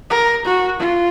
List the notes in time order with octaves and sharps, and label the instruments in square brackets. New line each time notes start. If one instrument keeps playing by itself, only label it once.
[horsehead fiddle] A#4
F#4
F4